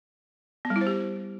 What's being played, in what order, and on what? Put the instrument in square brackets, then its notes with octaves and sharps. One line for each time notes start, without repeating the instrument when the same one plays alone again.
[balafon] B3
G3
E4
C5
G4